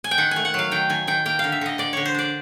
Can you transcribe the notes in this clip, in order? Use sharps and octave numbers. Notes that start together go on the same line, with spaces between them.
G#5
G5
D#3 F#5
A3 G#5
F#5
F#3 F5
D#3 G5
D#3 G#5
D#3 G5
A#3 G5
D3 F5
E5
D3 D#5
D3 D5
D3 C#5
C5
D4 D5